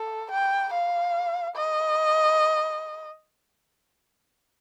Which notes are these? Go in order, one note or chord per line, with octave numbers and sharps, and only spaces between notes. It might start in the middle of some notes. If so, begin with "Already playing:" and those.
Already playing: A4
G5
F5
D#5